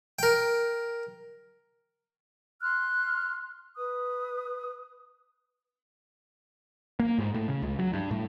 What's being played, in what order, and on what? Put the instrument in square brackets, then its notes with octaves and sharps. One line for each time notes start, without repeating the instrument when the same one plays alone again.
[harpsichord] A#4 G5
[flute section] C6 F6 F#6
B4 D#6
[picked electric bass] A#3
G#2
A2
C#3
C#2
F#3
G2
A2